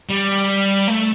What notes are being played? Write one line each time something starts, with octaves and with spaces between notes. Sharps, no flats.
G3
A3